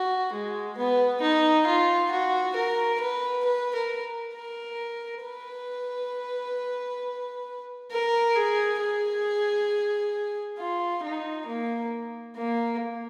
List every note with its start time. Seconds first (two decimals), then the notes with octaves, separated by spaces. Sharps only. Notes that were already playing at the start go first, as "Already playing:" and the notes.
Already playing: F#4
0.33 G#3
0.77 B3
1.21 D#4
1.66 F4
2.11 F#4
2.55 A#4
3.00 B4
3.45 B4
3.75 A#4
4.34 A#4
5.23 B4
7.91 A#4
8.35 G#4
8.80 G#4
10.58 F4
11.03 D#4
11.47 A#3
12.36 A#3